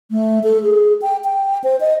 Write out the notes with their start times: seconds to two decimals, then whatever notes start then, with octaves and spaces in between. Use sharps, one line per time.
0.11 A3
0.44 A4
0.63 G#4
1.02 G5
1.25 G5
1.64 C5
1.81 D#5